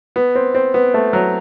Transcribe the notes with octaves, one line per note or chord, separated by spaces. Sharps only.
B3
C4
C4
B3
A3
F#3